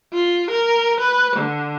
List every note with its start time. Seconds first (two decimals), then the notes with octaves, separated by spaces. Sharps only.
0.13 F4
0.51 A#4
1.00 B4
1.36 D3